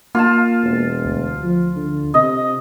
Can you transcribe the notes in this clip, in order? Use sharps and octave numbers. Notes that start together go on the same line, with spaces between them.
A#3 F4 A5
E1
D2
F3
D3
C3 D#5